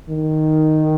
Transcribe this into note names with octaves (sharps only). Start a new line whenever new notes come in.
D#3